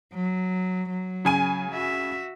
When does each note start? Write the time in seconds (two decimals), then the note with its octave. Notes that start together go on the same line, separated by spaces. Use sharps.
0.14 F#3
0.90 F#3
1.25 C#3 G#5 D#7
1.72 F#4 E5